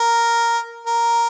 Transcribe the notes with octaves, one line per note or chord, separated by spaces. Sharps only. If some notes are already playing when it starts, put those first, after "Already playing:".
Already playing: A#4
A#4